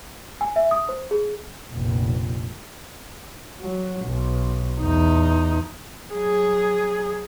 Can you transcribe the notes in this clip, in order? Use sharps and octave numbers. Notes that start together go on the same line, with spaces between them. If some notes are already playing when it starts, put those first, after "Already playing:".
G#5
E5
D#6
C5
G#4
F1 A#1
F#3
B1
E2 D#4
F#3 G#4